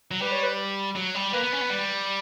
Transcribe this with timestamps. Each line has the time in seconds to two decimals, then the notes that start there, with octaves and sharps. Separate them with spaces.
0.11 F#3
0.22 G3 B4
0.32 C#5
0.43 B4
0.96 F#3
1.15 G3
1.33 A#3 B4
1.43 B3
1.52 C#4
1.61 B3
1.70 G3